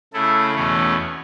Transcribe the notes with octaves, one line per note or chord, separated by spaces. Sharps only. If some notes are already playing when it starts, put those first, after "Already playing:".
C#3 A3 E4 A4
E2 B2 A3 C#4